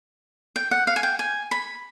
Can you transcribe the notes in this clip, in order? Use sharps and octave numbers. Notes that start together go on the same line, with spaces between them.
G5
F#5
F5
G#5
G5
G#5
B5